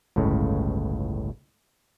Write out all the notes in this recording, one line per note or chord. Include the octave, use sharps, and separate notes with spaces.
G1 C#2 A2 C#3